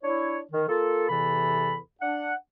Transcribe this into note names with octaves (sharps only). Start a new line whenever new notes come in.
D4 E4 C#5
D#3
A#3 F4 A4
E2 C3 E3 A4 B5
D4 F#5